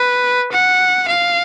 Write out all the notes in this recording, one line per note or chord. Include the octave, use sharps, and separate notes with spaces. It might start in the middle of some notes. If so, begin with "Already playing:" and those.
Already playing: B4
F#5
F5